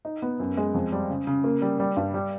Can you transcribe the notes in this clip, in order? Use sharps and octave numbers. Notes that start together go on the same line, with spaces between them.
D#4
B3
F#2
G#3
F2
G3
C#3
C#3
A#3
G3
G3
G2
G3